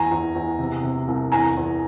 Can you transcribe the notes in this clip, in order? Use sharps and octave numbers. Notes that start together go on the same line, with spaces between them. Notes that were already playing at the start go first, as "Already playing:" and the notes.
Already playing: E2 G#5 A#5
E2
E2
C3
C3
C2
E2 G#5 A#5
E2